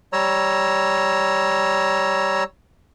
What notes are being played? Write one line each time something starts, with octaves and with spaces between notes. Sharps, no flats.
G3 C#5 A#5 E6